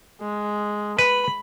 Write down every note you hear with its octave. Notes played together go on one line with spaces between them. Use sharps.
G#3
B4 B5